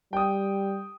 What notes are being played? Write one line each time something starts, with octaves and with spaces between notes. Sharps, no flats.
G3 G5 D#6